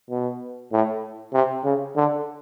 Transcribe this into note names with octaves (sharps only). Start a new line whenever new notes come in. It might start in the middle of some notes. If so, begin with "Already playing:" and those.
B2
A2
C3
C#3
D3